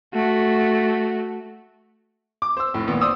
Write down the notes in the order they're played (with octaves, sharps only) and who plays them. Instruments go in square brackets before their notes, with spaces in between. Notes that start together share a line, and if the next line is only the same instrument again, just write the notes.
[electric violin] A3 F#4
[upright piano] D6
C5 E6
F1 A2
G#1 A#2 B3
C5 D5 D#6 E6